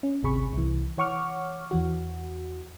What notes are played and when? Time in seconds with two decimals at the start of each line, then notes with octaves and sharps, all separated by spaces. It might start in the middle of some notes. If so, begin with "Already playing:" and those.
0.03 C#4
0.23 G#1 D2 C3 G#4 B5 C#6
0.53 C2 E3
0.98 E3 C#5 F#5 C#6 D6 F6
1.71 E2 E3 F#4